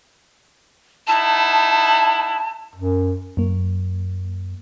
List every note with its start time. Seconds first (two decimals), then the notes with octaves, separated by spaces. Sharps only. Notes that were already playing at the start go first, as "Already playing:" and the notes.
1.07 B3 D#4 E4 A5
2.75 F#2
3.37 F#2 A#3